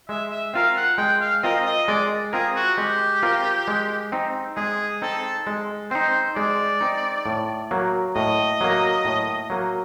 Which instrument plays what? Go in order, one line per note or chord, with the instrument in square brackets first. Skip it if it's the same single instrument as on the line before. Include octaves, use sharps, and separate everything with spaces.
[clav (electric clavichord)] G#3 [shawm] E5
[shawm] E5
[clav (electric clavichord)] C4 F4 A#4 [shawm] F5
[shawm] F#5
[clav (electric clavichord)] G#3 [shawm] G5
[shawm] F5
[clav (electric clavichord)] C4 F4 A#4 [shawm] D#5
[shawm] D#5
[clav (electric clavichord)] G#3 [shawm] D5
[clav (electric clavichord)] C4 F4 A#4 [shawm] G#4
[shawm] F#4
[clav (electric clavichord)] G#3 [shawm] G4
[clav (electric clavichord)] C4 F4 A#4
G#3
C4 D#4
[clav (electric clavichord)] G#3 [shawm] G#4
[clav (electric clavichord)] C4 D#4 [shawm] A4
[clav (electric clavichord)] G#3
[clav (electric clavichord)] C4 D#4 [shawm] C5
[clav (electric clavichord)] G#3 [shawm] D5
[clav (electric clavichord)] C4 D#4
A2
F#3 A#3
[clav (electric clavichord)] A2 [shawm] D#5
[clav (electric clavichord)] F#3 A#3
A2
F#3 A#3